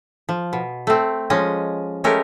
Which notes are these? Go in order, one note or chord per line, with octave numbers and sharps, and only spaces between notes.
F3
B2
A3 C4
F3 G#3 C#4 D#5
G#3 A3 C#4 G4 A#4